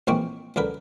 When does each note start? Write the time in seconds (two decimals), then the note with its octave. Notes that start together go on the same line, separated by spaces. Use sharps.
0.07 A#1 E3 G#3 A#3 C4 C#6
0.56 C#2 D3 A#4 B4